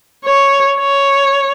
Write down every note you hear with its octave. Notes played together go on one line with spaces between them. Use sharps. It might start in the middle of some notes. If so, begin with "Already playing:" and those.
C#5
C#5